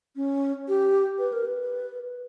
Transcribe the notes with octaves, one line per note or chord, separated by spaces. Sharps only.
C#4
G4
B4
A#4
B4